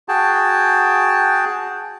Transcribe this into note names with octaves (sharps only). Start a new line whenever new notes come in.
F#4 G#4 G5 A5